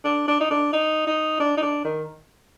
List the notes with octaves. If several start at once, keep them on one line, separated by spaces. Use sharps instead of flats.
D4
D4
D#4
D4
D#4
D#4
D4
D#4
D4
D#3